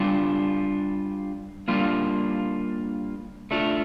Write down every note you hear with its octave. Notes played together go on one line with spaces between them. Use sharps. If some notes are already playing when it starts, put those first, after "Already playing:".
Already playing: G3 D4 F4
G3 A#3 D4 F4
A3 D4 F4